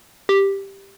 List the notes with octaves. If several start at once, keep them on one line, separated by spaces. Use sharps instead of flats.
G4